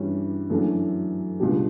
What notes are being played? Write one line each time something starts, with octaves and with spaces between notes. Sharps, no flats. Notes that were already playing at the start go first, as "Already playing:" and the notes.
Already playing: G2 E3 G3 C#4 F#4
F#2 E3 A3 D4 F#4
C#2 B2 G3 D4 G4